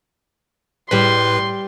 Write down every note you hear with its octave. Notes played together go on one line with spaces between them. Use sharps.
A2 G3 B4 B5 C6